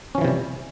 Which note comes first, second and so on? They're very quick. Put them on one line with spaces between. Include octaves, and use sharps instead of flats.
C#4 F3 E3 C3 G3